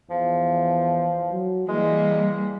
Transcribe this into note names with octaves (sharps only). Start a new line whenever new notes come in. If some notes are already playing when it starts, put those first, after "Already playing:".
E2 F3
F#3
E3 G3 G#3 A#3